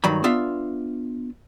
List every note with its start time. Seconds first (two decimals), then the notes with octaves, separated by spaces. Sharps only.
0.04 G2 D#3 F#3 B5
0.24 B3 D4 F4 E5